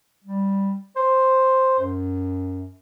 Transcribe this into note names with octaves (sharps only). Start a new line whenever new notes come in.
G3
C5
F#2